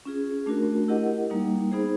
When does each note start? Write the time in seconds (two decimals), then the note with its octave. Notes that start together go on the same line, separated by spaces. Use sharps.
0.05 C#4 F4 G#4
0.46 A3 D4 F#4 A#4
0.88 E4 G4 A#4 D#5 F#5
1.30 G3 A#3 D#4
1.72 B3 D#4 G#4 C5